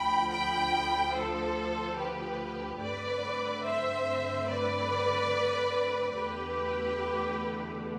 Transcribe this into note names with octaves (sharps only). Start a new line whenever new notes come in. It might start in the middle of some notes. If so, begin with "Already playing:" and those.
Already playing: D2 D3 F3 G5 B5
G5 B5
A4 C5
G4 B4
G2 D3 A3 C4 B4 D5
C5 E5
B4 D5
E2 D3 A3 G4 B4